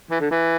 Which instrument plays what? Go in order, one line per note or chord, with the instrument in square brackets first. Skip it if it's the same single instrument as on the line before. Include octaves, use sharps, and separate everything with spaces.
[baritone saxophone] E3
D3
E3